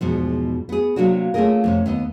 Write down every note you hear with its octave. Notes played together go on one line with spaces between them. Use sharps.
E2 G#2 B2 F3
B3 G#4
C3 F#3 A#3 D4 F#4
A3 C#4 D#4 F4 G#4 A#4
F2 C3 C#4
D#2 B3 D#5